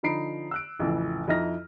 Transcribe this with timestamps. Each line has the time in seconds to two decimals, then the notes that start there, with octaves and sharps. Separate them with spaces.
0.03 D3 F3 D#4 B5 C7 D7
0.51 E6 F#6 D7
0.79 A1 F2 C#3 E3
1.28 F2 D#4 E4 D#5 F6 A#6